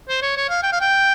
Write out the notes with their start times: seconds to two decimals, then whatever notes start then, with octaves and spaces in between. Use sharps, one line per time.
0.09 C5
0.22 C#5
0.37 C#5
0.49 F5
0.63 G5
0.72 F5
0.81 G5